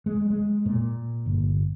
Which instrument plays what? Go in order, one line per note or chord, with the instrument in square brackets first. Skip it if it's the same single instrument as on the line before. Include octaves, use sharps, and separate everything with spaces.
[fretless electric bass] G#3
G#3
A#2
G1